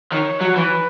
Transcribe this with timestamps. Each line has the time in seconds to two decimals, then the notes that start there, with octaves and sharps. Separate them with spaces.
0.12 D#3 C#5
0.41 F#3
0.56 E3 B4